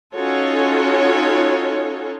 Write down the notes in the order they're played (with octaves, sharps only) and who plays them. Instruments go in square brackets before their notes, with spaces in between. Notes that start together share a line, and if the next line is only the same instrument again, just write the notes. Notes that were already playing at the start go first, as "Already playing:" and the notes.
[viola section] C#4 D#4 F4 F#4 A4 C#5